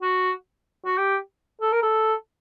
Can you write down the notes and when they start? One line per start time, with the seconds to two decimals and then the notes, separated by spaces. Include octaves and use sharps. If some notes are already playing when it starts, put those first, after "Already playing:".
0.02 F#4
0.85 F#4
0.98 G4
1.61 A4
1.72 A#4
1.83 A4